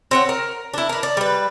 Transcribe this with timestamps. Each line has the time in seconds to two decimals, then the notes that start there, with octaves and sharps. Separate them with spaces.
0.11 C4 C#5 F#5
0.29 A#4
0.73 D4 E4
0.89 A#4 B4
1.03 D5
1.17 G3 B4